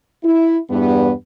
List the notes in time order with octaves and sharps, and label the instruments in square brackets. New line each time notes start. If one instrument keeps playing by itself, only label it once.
[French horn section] E4
E2 G2 B3